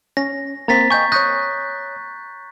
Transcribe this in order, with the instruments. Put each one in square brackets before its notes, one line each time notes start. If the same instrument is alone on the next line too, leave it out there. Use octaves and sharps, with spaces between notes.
[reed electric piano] C#4 [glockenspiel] A#6
[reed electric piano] A#3 C4 [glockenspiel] A#5 A6 B6
[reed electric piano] D#5 G5 G#5 [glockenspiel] C#6 G6
[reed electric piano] C#5 C#6 D#6 [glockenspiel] F#6 G6 A#6